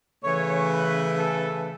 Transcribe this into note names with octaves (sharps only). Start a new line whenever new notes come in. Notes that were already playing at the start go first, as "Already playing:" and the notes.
C#3 E3 A3 C#5
B4
A4